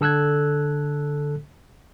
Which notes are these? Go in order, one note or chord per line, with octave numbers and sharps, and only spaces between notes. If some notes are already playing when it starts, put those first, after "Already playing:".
D3 A4 E6 F#6 G#6